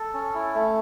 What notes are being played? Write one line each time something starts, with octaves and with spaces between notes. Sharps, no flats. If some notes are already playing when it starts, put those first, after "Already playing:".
Already playing: A4
C#4
E4
A3